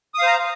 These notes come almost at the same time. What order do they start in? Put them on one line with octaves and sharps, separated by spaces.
D#6 F5 C5 A#5